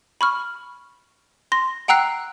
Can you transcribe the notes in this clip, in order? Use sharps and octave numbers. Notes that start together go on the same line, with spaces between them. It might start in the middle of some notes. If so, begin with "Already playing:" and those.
B5 C#6 F6
C6 A#6
F#5 G5 A#5 E6 F#6 C7